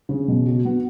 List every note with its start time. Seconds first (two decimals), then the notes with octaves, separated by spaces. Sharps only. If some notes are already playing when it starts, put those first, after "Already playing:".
0.09 C#3
0.28 B2
0.46 F#4
0.65 B3